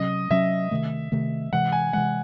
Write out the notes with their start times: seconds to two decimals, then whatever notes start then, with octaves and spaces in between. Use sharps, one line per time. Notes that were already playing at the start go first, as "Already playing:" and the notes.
Already playing: C3 F#3 C#4 D#5
0.30 C3 F#3 C#4 E5
0.71 C3 D#3 A3
1.12 C3 D#3 A3
1.53 C3 E3 G#3 F#5
1.72 G#5
1.93 C3 E3 G#3 F#5